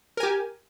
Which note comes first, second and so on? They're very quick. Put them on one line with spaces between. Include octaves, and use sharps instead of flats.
A#4 G#5 G4